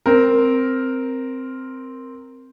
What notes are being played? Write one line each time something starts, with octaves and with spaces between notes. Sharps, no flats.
C4 A#4